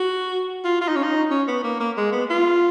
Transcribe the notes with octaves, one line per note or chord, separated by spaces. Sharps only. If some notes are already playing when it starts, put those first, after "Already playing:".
Already playing: F#4
F4
F4
D#4
C#4
D#4
C#4
B3
A#3
A#3
G#3
B3
F4